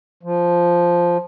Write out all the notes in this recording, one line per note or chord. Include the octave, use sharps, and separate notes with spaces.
F3